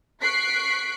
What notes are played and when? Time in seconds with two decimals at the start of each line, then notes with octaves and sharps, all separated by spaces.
0.23 C#6 F#6 B6 C7 D7